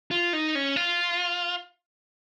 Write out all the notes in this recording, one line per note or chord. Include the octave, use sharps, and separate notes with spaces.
F4
D#4
C#4
F4